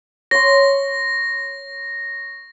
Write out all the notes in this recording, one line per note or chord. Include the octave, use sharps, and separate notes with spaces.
C#5 C6 A#6